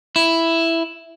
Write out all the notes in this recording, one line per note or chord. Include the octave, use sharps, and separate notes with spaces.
E4